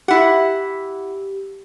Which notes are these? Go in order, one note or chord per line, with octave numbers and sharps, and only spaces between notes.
E4 G4 F#5